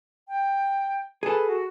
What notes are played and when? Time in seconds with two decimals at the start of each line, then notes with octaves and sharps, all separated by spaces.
0.28 G5
1.23 G#4 A4 B4
1.47 F#4